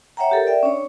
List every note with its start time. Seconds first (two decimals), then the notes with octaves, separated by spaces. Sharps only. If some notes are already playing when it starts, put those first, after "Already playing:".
0.17 C#5 E5 F#5 G5 A#5
0.31 G4 A4 A#4
0.47 D5 E5 G5
0.63 C#4 D4 C#5